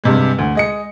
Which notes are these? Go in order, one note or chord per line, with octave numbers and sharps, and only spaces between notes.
G2 C3 G#3
D2
G#3 D#5 C#7